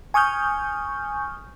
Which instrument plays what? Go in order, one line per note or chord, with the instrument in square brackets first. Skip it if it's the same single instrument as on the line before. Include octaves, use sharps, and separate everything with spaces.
[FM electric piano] G#5 C#6 D#6 F6 G6